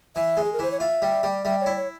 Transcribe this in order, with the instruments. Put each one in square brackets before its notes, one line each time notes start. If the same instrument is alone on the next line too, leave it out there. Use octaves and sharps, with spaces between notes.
[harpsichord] E3 [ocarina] E5
[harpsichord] G#3
[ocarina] G#4
A#4
[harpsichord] E3 [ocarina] C5
[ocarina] C#5
[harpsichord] F4 [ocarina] E5
[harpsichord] G3
G3
[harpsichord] G3 [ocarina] E5
[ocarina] C#5
[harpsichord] E4
[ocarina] C#5